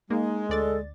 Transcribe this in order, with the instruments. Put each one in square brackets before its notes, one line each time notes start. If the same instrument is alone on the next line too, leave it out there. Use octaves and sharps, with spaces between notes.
[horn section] G#3 [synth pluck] A#3 [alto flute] D#4
[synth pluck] D2 D5 A6 [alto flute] A4